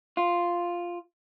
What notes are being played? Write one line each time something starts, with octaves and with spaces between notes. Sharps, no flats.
F4